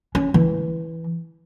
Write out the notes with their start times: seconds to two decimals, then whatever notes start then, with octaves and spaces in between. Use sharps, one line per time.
0.15 C#4
0.34 E3